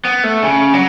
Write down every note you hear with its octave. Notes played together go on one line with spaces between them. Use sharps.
B3
A3
C#3
F#3